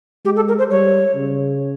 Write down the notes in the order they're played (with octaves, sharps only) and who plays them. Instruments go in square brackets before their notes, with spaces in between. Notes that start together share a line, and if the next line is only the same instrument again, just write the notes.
[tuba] G#3 [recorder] G4
[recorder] A4
A#4
C5
[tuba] G3 [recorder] C#5
[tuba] C#3